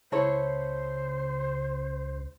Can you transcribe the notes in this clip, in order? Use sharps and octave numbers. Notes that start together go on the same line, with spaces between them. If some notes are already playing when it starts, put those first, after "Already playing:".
C#2 E4 A4 C5 C#5